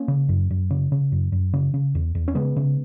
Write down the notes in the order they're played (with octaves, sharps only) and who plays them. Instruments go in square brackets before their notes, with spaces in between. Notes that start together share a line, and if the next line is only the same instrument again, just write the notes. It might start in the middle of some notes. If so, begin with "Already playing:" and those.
Already playing: [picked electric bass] A#3 C#4
C#3
F#2
F#2
C#3
C#3
F#2
F#2
C#3
C#3
E2
E2
C#4
C#3 G#3 B3
C#3